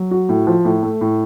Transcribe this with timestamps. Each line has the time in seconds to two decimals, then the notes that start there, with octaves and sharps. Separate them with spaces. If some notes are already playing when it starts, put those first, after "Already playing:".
Already playing: F#3
0.11 F#4
0.29 A2
0.47 F3
0.65 A2
0.83 A3
1.01 A2